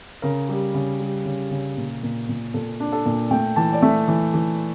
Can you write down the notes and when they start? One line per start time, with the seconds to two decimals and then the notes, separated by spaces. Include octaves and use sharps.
0.22 C#3 A#4
0.49 G3
0.74 C#3
1.00 G3
1.25 C#3
1.51 C#3
1.77 A#2
2.03 A#2
2.29 A#2
2.54 A#2 A4
2.80 D4
2.92 A4
3.06 A#2
3.31 A3 G5
3.56 E3 A5
3.73 D5
3.82 A3 E5
4.08 E3
4.34 E3